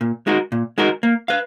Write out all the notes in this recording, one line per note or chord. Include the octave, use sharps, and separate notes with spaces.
A#2
G#3 D#4 F#4 A#4
A#2
G#3 D#4 F#4 A#4
A#3
B4 F5